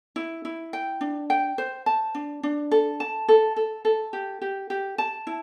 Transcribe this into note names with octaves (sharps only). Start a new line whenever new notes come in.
E4
E4
G5
D4
G5
C5
A5
D4
D4
A4
A5
A4
A4
A4
G4
G4
G4
A5
E4